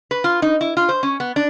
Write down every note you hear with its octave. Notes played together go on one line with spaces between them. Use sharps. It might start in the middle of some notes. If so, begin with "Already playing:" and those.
B4
F4
D#4
E4
F4
C5
C#4
B3
D4